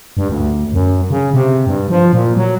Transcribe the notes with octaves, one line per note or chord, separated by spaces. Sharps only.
G2
D2
F#2
C#3
C3
G2
F3
A#2
F#3